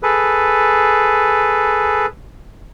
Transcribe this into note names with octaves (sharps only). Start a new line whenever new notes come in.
G#4 A4 B4